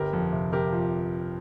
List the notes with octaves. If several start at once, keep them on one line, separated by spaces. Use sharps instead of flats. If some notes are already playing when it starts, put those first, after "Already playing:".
Already playing: G1 G4 A#4
F2
C3
C3 G4 A#4
F3